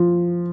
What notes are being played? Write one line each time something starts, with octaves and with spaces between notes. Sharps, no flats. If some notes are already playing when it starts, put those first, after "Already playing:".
Already playing: F3